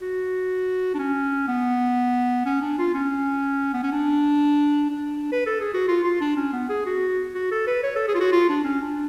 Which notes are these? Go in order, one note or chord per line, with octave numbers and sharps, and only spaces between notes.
F#4
D4
C#4
B3
C#4
D4
F4
C#4
B3
C#4
D4
D4
B4
A4
G#4
F#4
F4
F4
D4
C#4
B3
G#4
F#4
F#4
A4
B4
C#5
A4
G#4
F4
F#4
F4
D4
C#4
D4